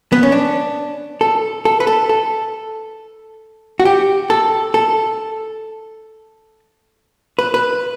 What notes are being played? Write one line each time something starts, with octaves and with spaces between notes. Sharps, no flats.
B3
C#4
D4
A4
A4
B4
A4
A4
F#4
G4
A4
A4
B4
B4